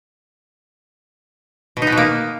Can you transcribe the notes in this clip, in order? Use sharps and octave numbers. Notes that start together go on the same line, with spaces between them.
B2
D#4
B3
B2
A#3